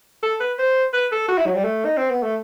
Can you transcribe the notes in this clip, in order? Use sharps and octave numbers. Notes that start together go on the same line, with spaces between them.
A4
B4
C5
B4
A4
F#4
E4
F#3
G3
A3
D#4
C4
B3
A3